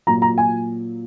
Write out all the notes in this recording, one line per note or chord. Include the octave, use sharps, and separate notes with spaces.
A#2 F#3 A#5
A#5
G#5